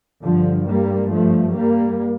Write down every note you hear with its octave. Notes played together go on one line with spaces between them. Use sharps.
G2 D3 F3
G3 A#3
F3 A3
G3 A#3